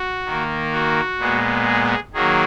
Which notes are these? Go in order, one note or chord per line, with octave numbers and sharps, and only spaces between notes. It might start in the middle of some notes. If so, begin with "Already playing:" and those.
Already playing: F#4
D#3 A#3
F#4
A#2 G#3 B3
G#4
D#3 F#3 A#3 G#4